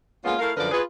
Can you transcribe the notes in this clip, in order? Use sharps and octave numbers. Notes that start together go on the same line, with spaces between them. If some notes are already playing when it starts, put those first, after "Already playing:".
G#3 A#3 B3 C#4 F4
A3 E4 A#4 F5
F#2 D3 F3 A#4 B4 D5
F4 G#4 B4